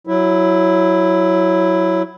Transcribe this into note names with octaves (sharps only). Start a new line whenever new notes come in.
F#3 E4